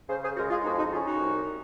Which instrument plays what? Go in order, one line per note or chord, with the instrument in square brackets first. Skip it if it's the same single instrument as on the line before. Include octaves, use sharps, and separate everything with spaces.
[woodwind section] C#3 G#4 C5
G#4 C5
G#3 F#4 A#4
F4 G#4
F2 D#4 F#4
D#4 F#4
C#4 F4 G#4
D#4 F#4
C2